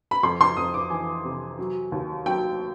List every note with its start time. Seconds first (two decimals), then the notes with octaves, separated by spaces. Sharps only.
0.11 B5
0.23 F2 C6
0.41 C6
0.57 F2 D#6
0.74 D6
0.90 E3 G#5
1.24 C3
1.59 F#3
1.92 D#2
2.26 F#3 G5